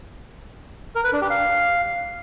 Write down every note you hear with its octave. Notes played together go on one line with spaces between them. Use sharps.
A#4
B4
D4
G4
F5